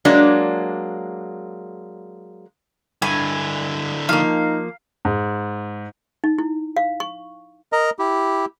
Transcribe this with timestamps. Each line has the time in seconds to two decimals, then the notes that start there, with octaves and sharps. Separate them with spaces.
0.05 F#3 G#3 A#3 D4
3.02 G2 D3 E4 G#5
4.09 F3 A#3 D#4 F5
5.05 G#2
6.24 D#4
6.38 E4
6.77 F5
7.00 C#6
7.73 A#4 D#5 A#5
7.99 E4 G4